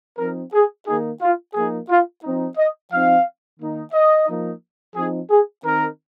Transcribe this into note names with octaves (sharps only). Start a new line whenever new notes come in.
F3 C4 D#4 A#4
G#4
D#3 A#3 D#4 G#4
F4
F3 A#3 D#4 G#4
F4
F3 C4 D#4
D#5
F3 C4 D#4 F5
D#3 A#3 D#4
D#5
F3 A#3 D#4
F3 C4 D#4 G#4
G#4
D#3 C4 D#4 A#4